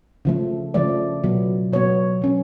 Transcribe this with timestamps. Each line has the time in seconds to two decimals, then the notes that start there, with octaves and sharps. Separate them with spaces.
0.25 C#3 F3 A3
0.74 C#3 F3 A3 D5
1.23 B2 F#3 B3
1.73 B2 F#3 B3 C#5
2.22 F#3 C#4